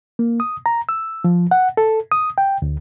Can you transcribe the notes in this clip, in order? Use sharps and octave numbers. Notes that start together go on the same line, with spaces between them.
A#3
D#6
A#5
E6
F3
F#5
A4
D#6
G5
D2